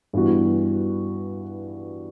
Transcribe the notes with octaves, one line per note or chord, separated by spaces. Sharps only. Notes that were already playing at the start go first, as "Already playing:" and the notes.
G2 E3 B3 F#4